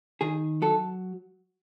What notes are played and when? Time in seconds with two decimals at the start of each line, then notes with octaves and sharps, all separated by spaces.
0.21 D#3 G#4
0.62 F#3 A4